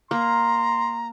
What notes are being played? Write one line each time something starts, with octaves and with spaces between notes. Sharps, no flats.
A#3 A#5 C6